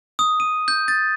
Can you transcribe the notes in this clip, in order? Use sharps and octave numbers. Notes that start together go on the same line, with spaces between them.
D#6
D#7
G6
A6